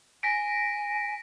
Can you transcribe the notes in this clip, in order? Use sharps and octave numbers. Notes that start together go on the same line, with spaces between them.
G#5 A#6 B6 D7